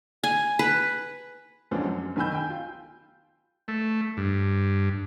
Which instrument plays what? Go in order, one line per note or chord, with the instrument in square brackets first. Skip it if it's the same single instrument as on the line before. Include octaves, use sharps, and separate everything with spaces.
[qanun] G#5
B4
[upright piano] E2 G#2 F3 G#3 C#4 D4
F#2
B1 D#3 G#5 B5 E6 G6
G5 G#5
F4
[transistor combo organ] A3
G2